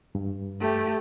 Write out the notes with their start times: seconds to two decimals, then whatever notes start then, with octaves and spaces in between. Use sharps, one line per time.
0.15 G2
0.60 A3 G4